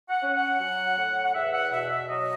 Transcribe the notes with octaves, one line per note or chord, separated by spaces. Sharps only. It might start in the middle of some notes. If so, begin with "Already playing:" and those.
F#5
C#4
F#5
F#3
A2
F#5
E2 E5
F#5
B2 E5
E5
F#3 D#5